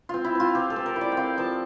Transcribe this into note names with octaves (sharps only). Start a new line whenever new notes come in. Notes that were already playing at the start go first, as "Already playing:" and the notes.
C4 F4
E4
C4 F4
C4 G4
A4
C4
A#4
E4
D5
G5
C4 F5
F3 A5